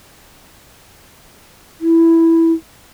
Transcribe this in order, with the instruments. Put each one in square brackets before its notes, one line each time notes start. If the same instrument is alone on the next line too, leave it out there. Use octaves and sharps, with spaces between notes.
[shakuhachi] E4